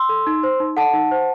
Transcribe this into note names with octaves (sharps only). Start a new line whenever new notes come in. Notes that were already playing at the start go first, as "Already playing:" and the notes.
Already playing: C6 E6
A4
D#4
C5
D#4
A4 F#5 A5
D#4
C5